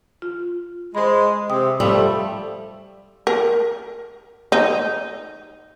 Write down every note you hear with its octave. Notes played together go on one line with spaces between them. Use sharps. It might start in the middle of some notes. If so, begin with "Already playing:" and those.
F4
G#3 C5 B5
C3 G5 D#6
F3 G3 A3
A#4
D#4